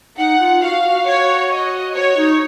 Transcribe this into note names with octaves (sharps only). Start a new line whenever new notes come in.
D#4 F#5
F4
F#4 F5
F#4
C#5
D#5
F#4 C#5
D#4